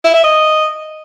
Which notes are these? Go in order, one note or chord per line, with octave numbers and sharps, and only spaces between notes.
E4
E5
D#5